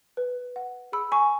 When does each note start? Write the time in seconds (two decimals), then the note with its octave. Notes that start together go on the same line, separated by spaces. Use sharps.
0.17 B4
0.56 F#5
0.92 G#4 B5 E6
1.12 G#5 C#6